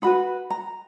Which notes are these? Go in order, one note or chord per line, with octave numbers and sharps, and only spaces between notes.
D#4 F#4 B4 B5
A#5